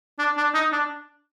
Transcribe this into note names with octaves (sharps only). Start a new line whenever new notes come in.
D4
D4
D#4
D4